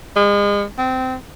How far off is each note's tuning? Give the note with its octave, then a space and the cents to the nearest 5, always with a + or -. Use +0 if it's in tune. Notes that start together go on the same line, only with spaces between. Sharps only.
G#3 -35
C4 -20